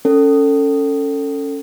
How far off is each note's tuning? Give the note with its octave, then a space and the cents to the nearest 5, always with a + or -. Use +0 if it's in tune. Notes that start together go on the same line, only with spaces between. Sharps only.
C#4 +0 A4 +20